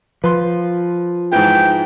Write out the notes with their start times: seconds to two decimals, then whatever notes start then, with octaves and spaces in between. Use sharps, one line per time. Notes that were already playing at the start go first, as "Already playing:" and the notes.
0.24 F3 B4 C6
1.32 G#2 E3 G5